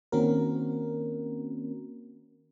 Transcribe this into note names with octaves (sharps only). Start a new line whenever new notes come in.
D#3 A#3 C4 C#4 F#4 A#4